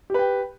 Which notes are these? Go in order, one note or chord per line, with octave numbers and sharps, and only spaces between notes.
G4 B4 G5